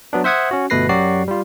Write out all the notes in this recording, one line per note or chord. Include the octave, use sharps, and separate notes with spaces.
F#3 B3 D4
C5 E5 F#5 D#6 G#6
C#4 F#4
G1 B2 A3 B4 A#6 C7
F#2 F#3 F#4 G4 D5 C7
G3 F4